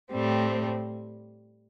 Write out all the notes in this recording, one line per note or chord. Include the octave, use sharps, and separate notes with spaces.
A2 G3 C4